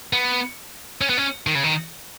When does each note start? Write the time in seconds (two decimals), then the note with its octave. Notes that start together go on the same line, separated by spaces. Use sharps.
0.13 B3
1.01 C#4
1.09 B3
1.18 C#4
1.47 D#3
1.55 C#3
1.64 D#3